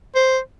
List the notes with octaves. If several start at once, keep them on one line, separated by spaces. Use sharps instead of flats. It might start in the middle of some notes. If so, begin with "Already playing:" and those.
C5